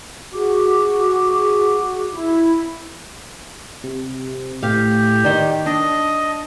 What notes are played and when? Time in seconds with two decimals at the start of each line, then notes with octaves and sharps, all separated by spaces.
0.33 F#4 G#4 D6
2.12 E4
3.84 C3
4.63 A2 G4 F5
5.25 D#3 C5 D5
5.66 D4 D#5 A5